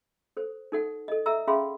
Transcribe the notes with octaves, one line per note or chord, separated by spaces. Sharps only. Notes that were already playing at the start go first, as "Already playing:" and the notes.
A4 C5
D#4 A4 F#5
A4 D#5
A4 E5 A#5 E6
C#4 G#4 E5 F5 B5 C6